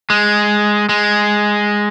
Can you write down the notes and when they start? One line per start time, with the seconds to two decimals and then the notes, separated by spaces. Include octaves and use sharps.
0.10 G#3
0.89 G#3